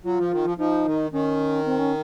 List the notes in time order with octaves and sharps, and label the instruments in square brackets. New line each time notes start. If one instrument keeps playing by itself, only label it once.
[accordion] F#3 [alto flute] F4
[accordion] F3
D#3
F3
[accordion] F3 [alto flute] D#4
[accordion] D#3
[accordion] D#3 [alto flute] C#4
[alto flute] C4
C#4